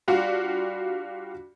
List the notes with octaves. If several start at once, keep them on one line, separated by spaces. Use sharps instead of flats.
G3 D4 F4 F#4